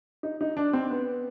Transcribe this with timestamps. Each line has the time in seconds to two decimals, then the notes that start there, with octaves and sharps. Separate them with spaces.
0.23 D#4
0.41 D#4
0.57 D4
0.73 C4
0.90 B3